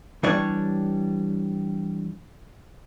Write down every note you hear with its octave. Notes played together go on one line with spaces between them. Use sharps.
E3 G3 D4 C#5